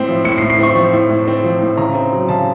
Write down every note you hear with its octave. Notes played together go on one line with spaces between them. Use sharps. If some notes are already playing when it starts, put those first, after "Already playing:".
Already playing: A2 C4
F3
A2 C#7
C7
A2
C7
C4 C#6
F3
A2
A2
C4
F3
A2
C#3 A#5
C4
F#3
C#3 A5